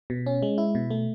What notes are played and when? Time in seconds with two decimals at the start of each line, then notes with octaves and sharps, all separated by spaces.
0.10 B2
0.26 C#4
0.42 G#3
0.58 E4
0.75 B2
0.90 A3